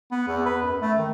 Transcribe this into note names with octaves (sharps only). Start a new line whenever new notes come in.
B3
E2
B4
F#2
A3
D#3